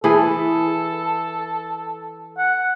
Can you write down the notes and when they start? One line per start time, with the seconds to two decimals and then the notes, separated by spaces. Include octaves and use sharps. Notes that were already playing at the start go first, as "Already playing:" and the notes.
0.04 E3 G#4 A4 B4
2.38 F#5